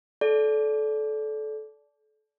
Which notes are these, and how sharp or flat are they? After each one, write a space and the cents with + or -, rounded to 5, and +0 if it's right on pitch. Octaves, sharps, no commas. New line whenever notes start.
A4 -25 D5 -15